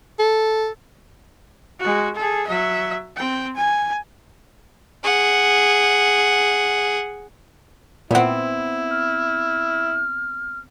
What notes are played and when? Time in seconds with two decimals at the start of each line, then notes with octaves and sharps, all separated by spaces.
0.19 A4
1.80 G#3 F#4
2.16 G#4 A4
2.47 F#3 E5
3.16 C4 G5
3.56 G#5
5.04 G#4 F#5
8.11 A#2 B3 C4 E4 F#5
8.90 F6